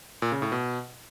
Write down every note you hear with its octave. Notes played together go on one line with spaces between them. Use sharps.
A#2
C#3
A2
B2